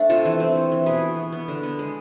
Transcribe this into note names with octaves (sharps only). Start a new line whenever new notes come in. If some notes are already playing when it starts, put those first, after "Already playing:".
Already playing: A3 C4 D4
C3 F4 A4
E3
C4
A3
E3
B2 G#4 B4
B2
B3
B3
D3
B3
G#3